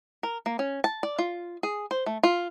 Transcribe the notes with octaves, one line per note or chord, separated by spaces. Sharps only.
A#4
A#3
C#4
A5
D5
F4
G#4
C5
A3
F4